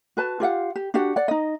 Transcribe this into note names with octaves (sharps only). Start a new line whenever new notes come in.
F#4 B4 A5
F4 G4 F5 F#5
G4
D4 F#4 G4 F#5
D5 F#5
D#4 D#5